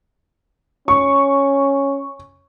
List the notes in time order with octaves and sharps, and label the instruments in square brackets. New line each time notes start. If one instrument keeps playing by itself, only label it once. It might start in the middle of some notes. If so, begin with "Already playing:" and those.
[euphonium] C#4 [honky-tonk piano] C#6